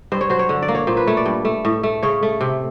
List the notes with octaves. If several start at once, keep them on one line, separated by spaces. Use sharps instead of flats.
G2 C5
C#5
F#3 C5
C#5
D3
D5
A#3
C#5
A#2 C5
B4
A3 C#5
D5
G2
A3
A2
A3
C#3 C#5
A3
C3